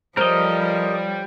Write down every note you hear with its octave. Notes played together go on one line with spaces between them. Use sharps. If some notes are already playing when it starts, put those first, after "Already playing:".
F3 G3 A4 A#4 C5 C#5 D#5